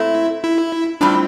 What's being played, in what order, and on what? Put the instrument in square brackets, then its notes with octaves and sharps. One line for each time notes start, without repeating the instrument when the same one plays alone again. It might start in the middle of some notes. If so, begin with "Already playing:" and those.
Already playing: [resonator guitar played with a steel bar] A#2 A3 C4 [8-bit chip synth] E4
[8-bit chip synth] E4
[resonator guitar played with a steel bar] A2 G3 C4 F4 [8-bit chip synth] D4